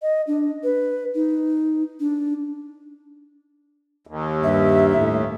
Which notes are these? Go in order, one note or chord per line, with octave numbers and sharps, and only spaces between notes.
D#5
D4
B4
D#4
D4
D#2
G2 E5
A2